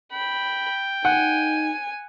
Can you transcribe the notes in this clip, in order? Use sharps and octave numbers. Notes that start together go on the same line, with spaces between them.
G5 B5
D#4 F#5 G#5